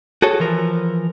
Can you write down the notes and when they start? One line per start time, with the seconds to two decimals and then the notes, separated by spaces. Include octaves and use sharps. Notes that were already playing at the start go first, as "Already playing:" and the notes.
0.22 F#4 G#4 A4 C#5
0.40 E3 F3 A#4